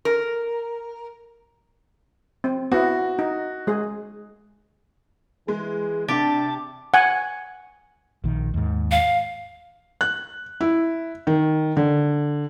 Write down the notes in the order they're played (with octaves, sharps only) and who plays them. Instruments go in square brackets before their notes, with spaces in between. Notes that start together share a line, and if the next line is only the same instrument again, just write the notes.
[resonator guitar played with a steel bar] A#4
[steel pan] C4
[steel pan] B3 E4 [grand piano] F#4
[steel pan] D#4
G#3 G#4
[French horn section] E3 G#4 [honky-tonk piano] G#3
[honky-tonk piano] C3 [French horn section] D4 [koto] G4 [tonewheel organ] A5
[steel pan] F#5 G#5
[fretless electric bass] A#1 D#3
D#2 G#2
[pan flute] F5
[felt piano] F#6
E4
D#3
D3